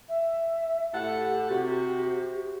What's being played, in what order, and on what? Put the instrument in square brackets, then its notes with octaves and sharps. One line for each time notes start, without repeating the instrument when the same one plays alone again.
[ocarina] E5
[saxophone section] A2 A4 F#5 [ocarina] G4
[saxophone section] C3 F#4